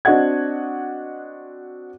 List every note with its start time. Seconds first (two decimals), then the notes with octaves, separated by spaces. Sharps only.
0.05 C4 D4 F#4 D#5 F#5 G#6